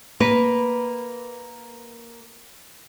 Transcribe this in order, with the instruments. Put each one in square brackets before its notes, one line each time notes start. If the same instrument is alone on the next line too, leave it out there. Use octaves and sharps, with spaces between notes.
[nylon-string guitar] A#3 A#4 B4